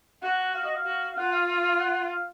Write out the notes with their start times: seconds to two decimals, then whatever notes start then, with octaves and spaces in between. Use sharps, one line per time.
0.22 F#4 F#5
0.38 F#5
0.54 F5
0.64 D#5
0.75 F5
0.85 F#4
1.13 F5
1.17 F4 F#5
1.32 F5
1.49 F5
1.59 F5
1.69 F5
1.80 F#5
2.11 F5